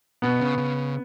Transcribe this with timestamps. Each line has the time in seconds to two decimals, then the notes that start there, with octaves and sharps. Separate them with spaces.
0.22 B2 B3
0.40 C#3
0.58 C#3